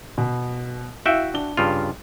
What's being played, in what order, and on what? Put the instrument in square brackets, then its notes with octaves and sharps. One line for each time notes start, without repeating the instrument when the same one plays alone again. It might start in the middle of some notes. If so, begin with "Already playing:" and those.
[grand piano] B2
[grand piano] E4 F5 [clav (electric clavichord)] F#4 E5 G5
[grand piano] D4 G7
[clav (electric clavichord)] G2 C#3 F4